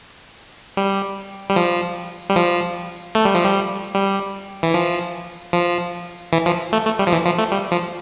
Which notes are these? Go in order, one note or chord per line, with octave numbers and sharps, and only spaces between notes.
G3
G3
F3
G3
F3
A3
G3
F3
G3
G3
E3
F3
F3
E3
F3
A3
A3
G3
F3
E3
F3
A3
G3
F3